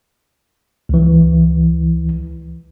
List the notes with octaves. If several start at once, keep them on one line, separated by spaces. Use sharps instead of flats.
C#2 E3